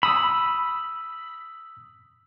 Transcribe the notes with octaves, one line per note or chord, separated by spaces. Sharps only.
B5 D#6 E6